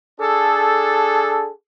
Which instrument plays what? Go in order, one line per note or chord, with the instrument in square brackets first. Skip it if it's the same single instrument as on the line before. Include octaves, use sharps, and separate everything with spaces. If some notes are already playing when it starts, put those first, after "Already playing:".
[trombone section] D4 G#4 A4